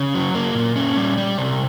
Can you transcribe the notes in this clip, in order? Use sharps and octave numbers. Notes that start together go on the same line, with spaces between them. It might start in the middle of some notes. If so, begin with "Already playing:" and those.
Already playing: C#3
F#3
A#3
A#2
C#4
G3
G3
C3